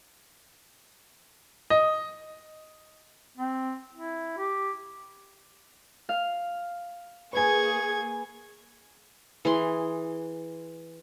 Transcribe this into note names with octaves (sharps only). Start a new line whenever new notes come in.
D#5
C4
E4
G4
F5
A#3 G#4 B4 G#5 C#6 G#6
E3 G#4 C6